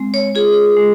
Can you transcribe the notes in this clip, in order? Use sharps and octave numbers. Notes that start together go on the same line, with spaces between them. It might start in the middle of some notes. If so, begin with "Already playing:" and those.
Already playing: G#3 C4
C#5
F4 G#4
G#3